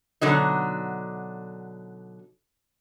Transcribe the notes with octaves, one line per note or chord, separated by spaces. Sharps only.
B2 D3 F#3 D#4